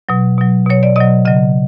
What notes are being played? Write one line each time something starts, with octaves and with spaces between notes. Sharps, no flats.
B2 F#3
B2 F#3
B2 F#3 C#5
D5
B2 F#3 D#5
C#3 F#3 D#5